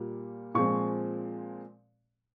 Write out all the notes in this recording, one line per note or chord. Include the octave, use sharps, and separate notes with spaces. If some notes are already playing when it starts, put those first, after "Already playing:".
Already playing: A#2 G3 A#3
A#2 F3 G#3 C4 C#6